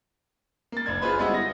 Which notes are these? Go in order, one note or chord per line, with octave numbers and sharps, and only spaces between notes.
A#3 A6
F#1 C#2 D4 G#6
F4 G#4 B4 C5 B5
G3 G#3 B3 D#4 E4 F#4
A#6